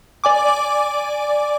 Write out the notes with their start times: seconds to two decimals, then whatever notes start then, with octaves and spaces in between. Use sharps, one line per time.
0.24 D5 G#5 D6